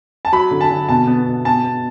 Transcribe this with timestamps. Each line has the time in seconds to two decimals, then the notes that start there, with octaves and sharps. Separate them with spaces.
0.25 A5
0.32 F#3 B5
0.51 D3
0.61 A5
0.70 D3
0.88 B2 A5
1.07 B3
1.27 B2
1.45 B3 A5
1.64 B3